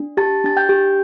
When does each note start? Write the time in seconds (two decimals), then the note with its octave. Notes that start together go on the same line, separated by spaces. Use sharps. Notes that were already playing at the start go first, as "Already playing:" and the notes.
Already playing: D4
0.17 G4 A5 A6
0.44 D4 A6
0.57 G5 G6
0.69 G4